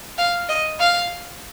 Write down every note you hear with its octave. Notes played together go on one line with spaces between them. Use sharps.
F5
D#5
F5